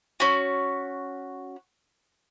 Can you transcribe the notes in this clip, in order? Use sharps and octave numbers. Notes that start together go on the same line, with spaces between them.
C#4 F#4